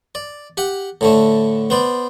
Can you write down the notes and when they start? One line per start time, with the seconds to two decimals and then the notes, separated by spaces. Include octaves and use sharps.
0.15 D5
0.57 G4 F#5
1.01 A2 D3 A3
1.70 B3 C5 D5